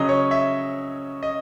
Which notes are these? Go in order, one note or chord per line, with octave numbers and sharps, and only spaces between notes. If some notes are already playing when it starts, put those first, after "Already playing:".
Already playing: C#3 F#3 C#4 D#5
C#5
E5
D#5